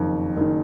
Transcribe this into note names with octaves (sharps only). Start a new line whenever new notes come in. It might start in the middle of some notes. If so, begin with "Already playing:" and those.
Already playing: F#1 F2 D#3
F#1 D#3